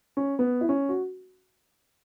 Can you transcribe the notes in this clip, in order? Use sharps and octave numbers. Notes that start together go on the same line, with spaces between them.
C#4
B3
E4
C#4
F#4